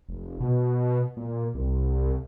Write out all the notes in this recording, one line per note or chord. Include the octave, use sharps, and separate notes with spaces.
F1
B2
A#2
C2